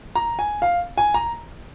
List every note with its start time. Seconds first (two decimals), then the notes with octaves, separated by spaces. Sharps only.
0.15 A#5
0.39 G#5
0.62 F5
0.98 G#5
1.14 A#5